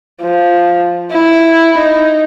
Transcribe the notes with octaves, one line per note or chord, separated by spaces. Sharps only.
F3
E4
D#4